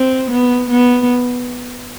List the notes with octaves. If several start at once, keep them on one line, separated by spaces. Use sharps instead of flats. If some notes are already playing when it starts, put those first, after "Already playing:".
Already playing: C4
B3
B3